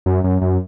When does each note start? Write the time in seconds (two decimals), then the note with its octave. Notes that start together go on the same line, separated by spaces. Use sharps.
0.06 F#2
0.24 F#2
0.42 F#2